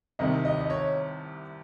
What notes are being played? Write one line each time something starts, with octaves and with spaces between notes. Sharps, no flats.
C2 C3 D#3 D#5
D#5
D#5
C#5